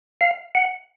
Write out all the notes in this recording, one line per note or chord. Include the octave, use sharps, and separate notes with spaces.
F5
F#5